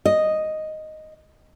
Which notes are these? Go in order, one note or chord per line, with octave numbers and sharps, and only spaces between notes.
D#5